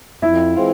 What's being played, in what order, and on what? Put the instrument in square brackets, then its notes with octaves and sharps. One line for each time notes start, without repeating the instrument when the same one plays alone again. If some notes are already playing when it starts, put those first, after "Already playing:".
[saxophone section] F2 [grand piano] E4 E5
[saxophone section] E3 G#3 C4 F4